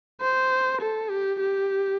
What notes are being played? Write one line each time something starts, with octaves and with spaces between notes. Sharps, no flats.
C5
A4
G4
G4